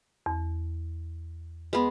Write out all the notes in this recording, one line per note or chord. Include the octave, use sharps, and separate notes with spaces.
E2
G#3 B3 B4